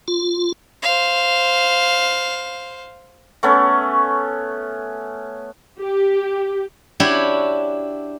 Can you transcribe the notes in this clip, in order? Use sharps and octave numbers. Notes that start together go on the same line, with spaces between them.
F4
C5 F5
A3 B3 C#4
G4
D4 E4 F#4 G4 C#5